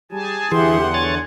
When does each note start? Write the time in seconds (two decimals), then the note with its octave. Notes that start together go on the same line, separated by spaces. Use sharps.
0.12 G3 G4 G#4 G#5 A5
0.52 E2 D3 E3 G4 G#4 E5 F#5 C6
0.94 C#5 G#5 A6